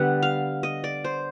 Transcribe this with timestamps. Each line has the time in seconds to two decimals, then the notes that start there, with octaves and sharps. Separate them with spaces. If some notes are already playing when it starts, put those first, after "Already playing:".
Already playing: D3 G3 B3 F#5
0.22 F5
0.63 D#5
0.84 D5
1.04 C5